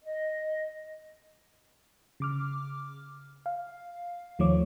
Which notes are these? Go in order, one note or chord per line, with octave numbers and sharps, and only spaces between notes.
D#5
C#3 D6 F6
F5
D#2 D#3 F3 A3 C#5 D6